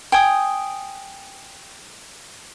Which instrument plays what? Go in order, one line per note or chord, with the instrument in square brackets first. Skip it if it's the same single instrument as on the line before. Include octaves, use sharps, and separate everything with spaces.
[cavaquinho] G5 G#5 D#6